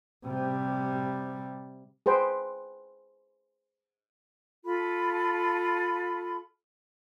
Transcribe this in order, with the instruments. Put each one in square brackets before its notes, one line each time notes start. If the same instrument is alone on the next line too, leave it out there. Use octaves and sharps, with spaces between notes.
[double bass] C3 G3
[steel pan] G#4 B4 C5 G5
[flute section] F4 A4 B5